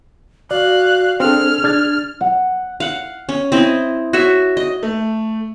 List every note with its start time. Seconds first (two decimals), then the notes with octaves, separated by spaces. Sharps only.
0.51 F#4 D5 F5 F#6
1.20 C4 D4 G#4 A4 F6
1.64 D4 F6 G#6 A6
2.21 F#5
2.80 F5 F#5
3.29 C#4
3.52 C4 E4 D#5
4.13 F#4 C#5 E5
4.57 D#5
4.83 A3